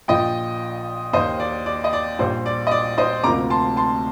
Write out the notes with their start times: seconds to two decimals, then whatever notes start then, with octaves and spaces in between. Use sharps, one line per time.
0.08 A#1 A#2 F3 D#5 G5
1.13 D#2 D#3 A#3 C5 D#5
1.40 D5
1.66 D5
1.84 D#5
1.93 D5
2.19 A#1 A#2 G3 C5
2.46 D5
2.67 D#5
2.71 D5
2.98 C5 D#5
3.24 D2 C3 F3 A#3 A#5 D6
3.50 A5 C6
3.77 A5 C6